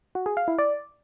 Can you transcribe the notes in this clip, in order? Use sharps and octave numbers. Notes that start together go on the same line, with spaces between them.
F#4
G#4
F5
E4
D5